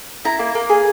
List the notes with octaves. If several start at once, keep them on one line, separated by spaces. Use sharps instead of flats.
E4 A#5
A#3
A#3
G#4